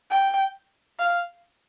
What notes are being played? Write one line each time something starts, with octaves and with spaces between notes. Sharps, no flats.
G5
F5